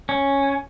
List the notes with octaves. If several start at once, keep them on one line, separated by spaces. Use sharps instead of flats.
C#4